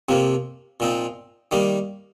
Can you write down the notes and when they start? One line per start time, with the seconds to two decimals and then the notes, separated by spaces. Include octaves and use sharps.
0.09 F2 C3 F3 A#3
0.80 A#2 F3 C4 D#4
1.51 D#3 G3 A#3 D#4